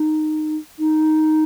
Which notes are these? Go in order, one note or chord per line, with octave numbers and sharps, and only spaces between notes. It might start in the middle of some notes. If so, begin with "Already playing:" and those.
Already playing: D#4
D#4